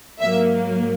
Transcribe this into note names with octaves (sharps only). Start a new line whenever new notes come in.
G#2 F#3 A#3 E5